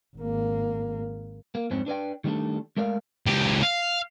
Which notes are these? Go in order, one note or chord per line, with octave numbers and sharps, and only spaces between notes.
G#1 A#3
A#3
F2 G#2 C4 C#4
D4 B4 D5 G5
D#3 G3 A3 D4 A4
G#3 A3 A#4 D5 F5
C#2 G4
F5